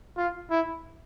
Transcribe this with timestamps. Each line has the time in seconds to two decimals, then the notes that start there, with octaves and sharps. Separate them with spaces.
0.17 F4
0.50 E4